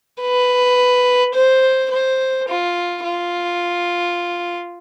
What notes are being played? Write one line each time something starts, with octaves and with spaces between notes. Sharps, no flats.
B4
C5
C5
F4
F4